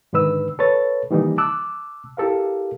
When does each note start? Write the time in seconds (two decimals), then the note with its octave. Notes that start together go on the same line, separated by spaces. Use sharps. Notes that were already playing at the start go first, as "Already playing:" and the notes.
0.13 G#2 D3 D#3 B4 E6
0.59 A4 B4 C#5 A6
1.11 D#3 E3 G3 A#3 D#4
1.38 A5 D6 E6 F#6
2.17 E4 G4 A4 A#4 F5